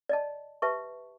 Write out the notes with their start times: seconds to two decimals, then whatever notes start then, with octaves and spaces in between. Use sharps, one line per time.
0.09 D5 D#5 A5
0.62 G4 B4 E5 A5 C#6